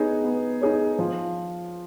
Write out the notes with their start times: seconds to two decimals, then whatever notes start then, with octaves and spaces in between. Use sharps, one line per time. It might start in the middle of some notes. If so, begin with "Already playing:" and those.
Already playing: B3 D#4 G#4 C#5
0.24 B3
0.62 D#4 G#4 C#5
0.99 F3